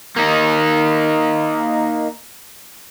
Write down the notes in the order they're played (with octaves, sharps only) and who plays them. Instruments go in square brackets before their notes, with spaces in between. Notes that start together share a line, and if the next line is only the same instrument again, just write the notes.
[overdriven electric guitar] A#3 D#4